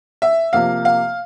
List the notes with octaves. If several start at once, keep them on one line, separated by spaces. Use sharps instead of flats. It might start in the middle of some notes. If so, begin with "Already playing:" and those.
E5
C3 F3 A#3 F5
F5